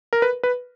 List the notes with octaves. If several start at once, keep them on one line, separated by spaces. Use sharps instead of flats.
A#4
B4
B4